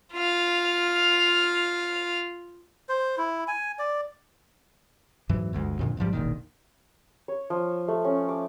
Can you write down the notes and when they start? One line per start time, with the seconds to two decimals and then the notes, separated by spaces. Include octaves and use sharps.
0.13 F4 F5
2.89 C5
3.18 E4
3.48 G#5
3.79 D5
5.29 F2 G#2 E3 F#3
5.53 G1 D2 C3 G#3
5.79 F2 A#2 D3
5.97 A1 G#2 F3 G3
6.13 E1 A1 A#2 D#3
7.28 C#5
7.50 F3
7.88 A3
8.05 C#4
8.29 D6